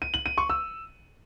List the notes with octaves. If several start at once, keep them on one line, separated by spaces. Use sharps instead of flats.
D#7
F#7
D#7
C#6
E6